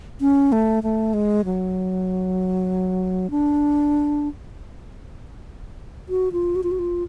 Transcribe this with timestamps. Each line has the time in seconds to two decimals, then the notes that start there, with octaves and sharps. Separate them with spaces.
0.21 C#4
0.52 A3
0.83 A3
1.14 G#3
1.45 F#3
3.31 D4
6.09 F#4
6.32 F4
6.56 F#4
6.63 F4
6.71 F#4
6.79 F4